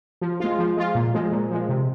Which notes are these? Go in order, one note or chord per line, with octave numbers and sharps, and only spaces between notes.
F3
G#3 F4
F3
G#3 F4
A#2
F3 G#3
A#2
F3 G#3
C3